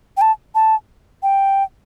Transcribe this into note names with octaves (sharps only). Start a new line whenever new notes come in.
G5
A5
A5
G5